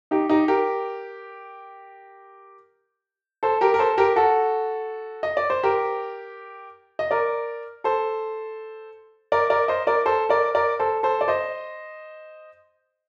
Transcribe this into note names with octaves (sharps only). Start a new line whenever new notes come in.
D#4 G4
D#4 G4
G4 A#4
A4 C5
G4 A#4
A#4
A4 C5
G4 A#4
F#4 A4
D#5
D5
C5
G4 A#4
D#5
A#4 D5
A4 C5
A#4 D5
A#4 D5
C5 D#5
A#4 D5
A4 C5
A#4 D5
A#4 D5
A4 C5
A4 C5
D5
C5 D#5